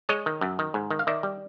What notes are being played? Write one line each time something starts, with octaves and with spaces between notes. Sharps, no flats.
G#3 C#5 D#5
D#3
F#2
D#3
G#2
D#3
F5
D#3 D5 E5
G3